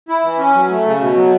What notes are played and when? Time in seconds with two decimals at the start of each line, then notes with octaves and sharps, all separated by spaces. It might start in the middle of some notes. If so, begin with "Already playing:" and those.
0.09 E4
0.24 E3
0.39 C#4
0.54 F#3
0.70 A3
0.86 C#3
1.00 B2
1.16 F#3